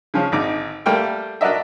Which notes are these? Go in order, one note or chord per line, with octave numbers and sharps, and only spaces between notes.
C#3 F3 C#4
G#1 D3 D#4 D6
G3 A3 A#3 G5 F6
D4 F#4 A#4 D#5 E5